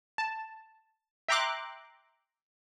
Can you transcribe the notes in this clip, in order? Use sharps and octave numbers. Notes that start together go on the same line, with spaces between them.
A5
E5 G5 A#5 C6 D6 F#6